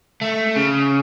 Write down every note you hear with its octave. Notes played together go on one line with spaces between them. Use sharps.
A3
C#3